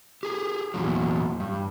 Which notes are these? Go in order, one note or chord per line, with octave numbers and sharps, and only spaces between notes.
G4 G#4
E2 A#2 F#3
G2